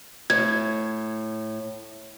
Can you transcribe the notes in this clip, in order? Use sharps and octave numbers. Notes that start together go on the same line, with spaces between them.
A2 G#6